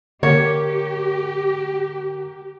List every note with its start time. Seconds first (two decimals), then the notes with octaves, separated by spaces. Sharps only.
0.23 D3 A#3 G4 C#5